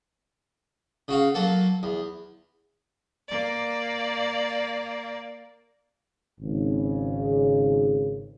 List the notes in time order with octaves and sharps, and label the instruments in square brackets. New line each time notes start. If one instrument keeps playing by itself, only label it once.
[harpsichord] C#3 F#4 F5
F#3 A#3 A4
E2
[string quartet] A#3 D5
[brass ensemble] G#1 C#3